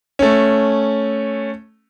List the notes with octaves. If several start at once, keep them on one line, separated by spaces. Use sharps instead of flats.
A3 C#4